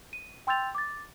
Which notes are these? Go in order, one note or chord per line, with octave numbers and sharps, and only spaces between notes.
D#7
G5 C6 E6 G6 A6 F7
D6 A6